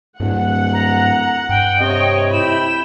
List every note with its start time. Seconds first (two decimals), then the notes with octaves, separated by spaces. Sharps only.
0.20 D1 G2 F#5
0.73 A#5
1.49 G2 G5
1.81 C3 C#5 D#5
2.33 E4 G5 B5 E7